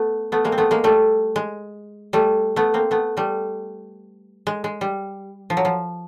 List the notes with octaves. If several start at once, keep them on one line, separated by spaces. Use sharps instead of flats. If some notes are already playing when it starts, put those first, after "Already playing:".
Already playing: A3 B3
A3 B3
G#3 A#3
C4
A3 B3
G#3 A#3
G3 A3
G#3
G3 A3
A3 B3
A#3 C4
A3 B3
G3 A3
G#3
G#3
G3
F3
F#3
F3